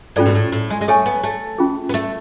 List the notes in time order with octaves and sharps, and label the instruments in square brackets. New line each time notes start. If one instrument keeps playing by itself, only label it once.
[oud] G#2 [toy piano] C#4 F4 A4 D5
[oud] B2
A2
A2
G#3
G#3
[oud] A3 [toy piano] A4 C#5 G#5 C#6
[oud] B3
A3
[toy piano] C#4 F4 G#4
[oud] B3
A3